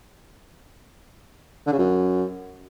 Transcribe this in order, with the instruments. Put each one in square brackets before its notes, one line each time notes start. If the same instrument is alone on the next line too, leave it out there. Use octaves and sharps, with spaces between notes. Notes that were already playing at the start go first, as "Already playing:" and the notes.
[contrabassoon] D3
C#3
F#2